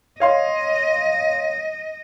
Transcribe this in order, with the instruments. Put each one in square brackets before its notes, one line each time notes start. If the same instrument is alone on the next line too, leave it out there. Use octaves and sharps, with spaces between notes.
[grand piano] C#5 F5 C6 [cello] D#5